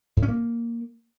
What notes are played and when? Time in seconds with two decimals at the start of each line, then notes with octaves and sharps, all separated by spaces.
0.17 A2
0.22 C#4
0.28 A#3